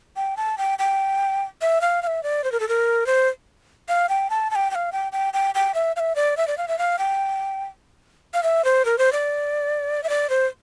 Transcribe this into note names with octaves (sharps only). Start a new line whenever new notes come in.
G5
A5
G5
G5
E5
F5
F5
E5
D5
C5
A#4
A4
A#4
C5
F5
G5
A5
A5
G5
G5
F5
G5
G5
G5
G5
E5
F5
E5
D5
E5
D5
F5
E5
F5
G5
F5
E5
C5
A#4
C5
D5
E5
D5
C5